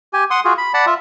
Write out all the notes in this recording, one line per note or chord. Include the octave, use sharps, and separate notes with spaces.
G4 G#5
F#5 C6 D#6
F4 F#4 G#4
B5
D5 F#5 A5 B5
F4 E5